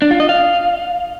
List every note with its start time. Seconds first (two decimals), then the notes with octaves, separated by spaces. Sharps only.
0.02 D4
0.11 F4
0.20 D#5
0.29 F5